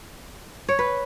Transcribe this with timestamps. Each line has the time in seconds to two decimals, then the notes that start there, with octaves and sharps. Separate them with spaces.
0.69 C#5
0.79 B4